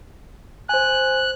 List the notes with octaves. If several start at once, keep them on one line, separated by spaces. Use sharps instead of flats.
C5 G#5 F#6